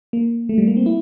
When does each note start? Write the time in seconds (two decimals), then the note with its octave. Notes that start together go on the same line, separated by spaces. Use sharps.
0.13 A#3
0.49 A3
0.58 G3
0.67 A#3
0.77 C4
0.86 E4